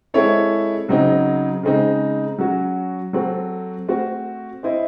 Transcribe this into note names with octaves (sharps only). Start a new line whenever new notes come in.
G#3 C4 E4 A4 C#5
C#3 F#3 C4 D#4
C#3 G#3 C4 D#4
F#3 C#4 F#4
F#3 C4 F#4 A4
A3 C4 F#4
C4 E4 C5 D#5